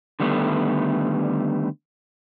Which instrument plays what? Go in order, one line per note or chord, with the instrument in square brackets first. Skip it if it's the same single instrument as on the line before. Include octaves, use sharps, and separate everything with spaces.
[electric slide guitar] D3 D#3 G3 A3 B3